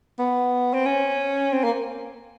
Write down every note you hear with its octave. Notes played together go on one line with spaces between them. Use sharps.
B3
C4
C#4
C4
A#3